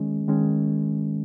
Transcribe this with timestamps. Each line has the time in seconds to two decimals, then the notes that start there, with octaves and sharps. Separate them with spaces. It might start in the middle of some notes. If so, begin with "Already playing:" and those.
Already playing: D#3 G#3 C#4
0.28 D#3 G#3 C#4